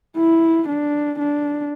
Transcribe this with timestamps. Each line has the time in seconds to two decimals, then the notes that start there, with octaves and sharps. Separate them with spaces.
0.17 E4
0.68 D4
1.19 D4